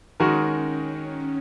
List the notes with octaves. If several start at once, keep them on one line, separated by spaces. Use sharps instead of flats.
D#3 G#3 C#4 D#4 F#4 A#4